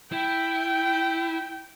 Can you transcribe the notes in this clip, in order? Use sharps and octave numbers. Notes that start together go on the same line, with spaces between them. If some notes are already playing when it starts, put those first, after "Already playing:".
E4 G5